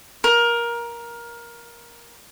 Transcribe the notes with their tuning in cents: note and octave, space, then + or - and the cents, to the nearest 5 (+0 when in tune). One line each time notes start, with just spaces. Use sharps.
A#4 +15